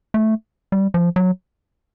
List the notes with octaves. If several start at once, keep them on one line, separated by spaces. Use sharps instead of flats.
A3
G3
F3
F#3